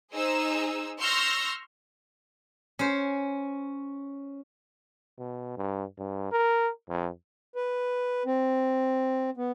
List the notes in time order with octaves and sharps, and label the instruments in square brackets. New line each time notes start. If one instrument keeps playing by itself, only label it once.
[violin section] D#4 G#4 C5 E6
C6 C#6 E6 F6 G6 A#6
[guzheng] C#4 C5
[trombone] B2
G2
G2
A#4
F2
[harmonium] B4
C4
B3